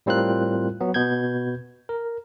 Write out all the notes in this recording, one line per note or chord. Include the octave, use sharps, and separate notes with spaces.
A2 G3 C4 F4 A#4 F#6
F#3 B3
B2 B3 G6 G#6
A#4